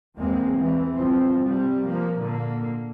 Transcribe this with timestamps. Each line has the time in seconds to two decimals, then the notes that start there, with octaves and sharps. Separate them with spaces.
0.16 E2 G#3 A#3 C4
0.59 E3 G#3 C4
0.96 G1 F3 C4
1.45 C3 G3
1.86 F3 A#3
2.21 A#2 D3 A#3